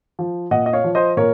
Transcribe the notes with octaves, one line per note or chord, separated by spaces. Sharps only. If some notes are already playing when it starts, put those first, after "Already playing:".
F3
A#2 D#5 F#5
D#5
C#5 F5
F3
C5 D#5
A#2 A#4 C#5